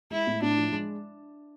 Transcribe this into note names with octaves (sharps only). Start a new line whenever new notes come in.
G#3 E4
A2
A2 D4
F3
G#3